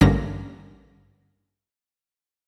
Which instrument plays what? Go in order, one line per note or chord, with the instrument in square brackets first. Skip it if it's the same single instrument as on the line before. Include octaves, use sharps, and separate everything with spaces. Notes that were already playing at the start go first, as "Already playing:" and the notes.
[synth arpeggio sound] A1 G2 D3 A#3 C#4 A#6